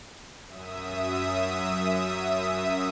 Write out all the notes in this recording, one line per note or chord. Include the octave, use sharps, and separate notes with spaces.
F#2 E5 D#6